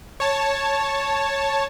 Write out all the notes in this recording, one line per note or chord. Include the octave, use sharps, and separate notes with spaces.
C#5 A5